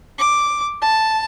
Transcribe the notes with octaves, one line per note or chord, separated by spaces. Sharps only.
D6
A5